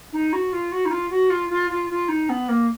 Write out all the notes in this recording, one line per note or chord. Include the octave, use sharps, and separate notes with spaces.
D#4
F#4
F4
F#4
D#4
F4
F#4
F4
F4
F4
F4
D#4
B3
A#3